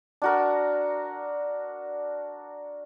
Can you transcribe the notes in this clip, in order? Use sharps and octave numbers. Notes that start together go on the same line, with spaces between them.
D4 F#4 A#4